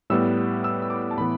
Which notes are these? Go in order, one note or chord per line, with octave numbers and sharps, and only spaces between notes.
A2 G3 B3 E6
E6
E6
D6
A5
A2 E3 B3 B5